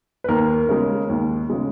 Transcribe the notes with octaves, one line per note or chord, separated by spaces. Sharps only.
B4
D#2 A#4
C#3 G#3
D#2
C#3 G#3